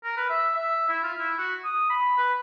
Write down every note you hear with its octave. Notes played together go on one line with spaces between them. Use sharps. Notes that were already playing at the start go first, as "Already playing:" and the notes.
A#4
B4
E5
E5
E4
F4
E4
F#4
D#6
B5
B4